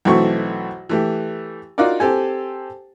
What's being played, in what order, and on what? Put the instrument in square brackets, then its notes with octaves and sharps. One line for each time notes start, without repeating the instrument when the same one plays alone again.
[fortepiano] B1 B2 E3 A3 C4 C#6
E3 A3 G4
D#4 F4 F#4 A#4 D5
C4 G4 A4 G#5